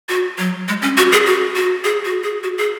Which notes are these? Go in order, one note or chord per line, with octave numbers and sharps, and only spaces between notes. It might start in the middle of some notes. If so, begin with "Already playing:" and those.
F#4
F#3
G#3
C#4
F#4
G#4
F#4
F#4
G#4
F#4
G#4
F#4
G#4